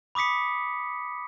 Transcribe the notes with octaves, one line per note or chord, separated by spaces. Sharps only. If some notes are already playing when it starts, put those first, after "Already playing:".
B5 D6 D#6 B6 C#7